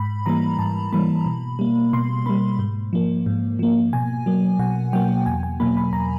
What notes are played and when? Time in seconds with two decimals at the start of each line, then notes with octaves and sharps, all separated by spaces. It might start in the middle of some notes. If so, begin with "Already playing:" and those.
Already playing: G#2 B5
0.26 E3 G3 A#3 A#5
0.59 G#2 A5
0.93 E3 G3 A#3 B5
1.26 B2
1.59 G3 A#3
1.93 B2 C6
2.26 G3 A#3 B5
2.59 G#2
2.93 F3 A#3
3.26 G#2
3.59 F3 A#3
3.93 B2 G#5
4.26 F#3 A#3
4.59 B2 F#5
4.93 F#3 A#3 G5
5.26 E2 G#5
5.43 G#5
5.60 B2 F#3 A#3 B5
5.77 B5
5.93 E2 A#5